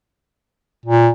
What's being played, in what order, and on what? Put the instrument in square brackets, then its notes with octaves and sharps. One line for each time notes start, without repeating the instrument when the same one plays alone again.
[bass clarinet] A#2